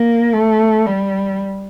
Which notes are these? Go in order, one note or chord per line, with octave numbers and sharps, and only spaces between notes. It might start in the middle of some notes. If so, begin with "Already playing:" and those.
Already playing: A#3
A3
G3